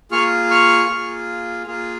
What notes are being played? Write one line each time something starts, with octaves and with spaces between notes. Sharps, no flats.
A#3 F4 G#4 C#6 F6
C#6 F6
A#3 F4 G#4
A#3 F4 G#4